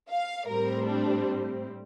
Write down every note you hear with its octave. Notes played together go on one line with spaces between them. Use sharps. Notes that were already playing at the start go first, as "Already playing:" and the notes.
F5
A2 G3 C4 A#4
D4